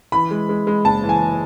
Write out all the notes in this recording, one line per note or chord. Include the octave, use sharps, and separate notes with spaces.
E3 B5
G#3
G#3
G#3
F#1 A5
E3
G#5